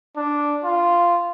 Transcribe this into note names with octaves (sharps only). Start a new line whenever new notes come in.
D4
F4